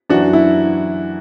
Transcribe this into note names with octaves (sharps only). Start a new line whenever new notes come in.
F#2 E3 D4 F#4
E4